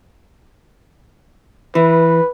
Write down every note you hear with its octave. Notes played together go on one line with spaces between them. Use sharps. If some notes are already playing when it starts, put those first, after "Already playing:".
E3 B4